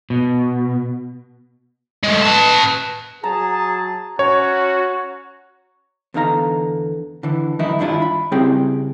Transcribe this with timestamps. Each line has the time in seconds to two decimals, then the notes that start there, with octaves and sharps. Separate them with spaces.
0.10 B2
2.04 G#3 A3
2.22 B4 A5
3.24 F#3 G#4 A5 A#5
4.19 C#4 F#4 C#5
6.14 E2 D3 D#4 F5 A#5
7.23 D3 E3
7.59 F#2 D#3 E3 D#4 E4
7.79 G2 D#3 D4 E4 F4
8.02 B5
8.32 C#3 G3 C4 E4 G#4 G5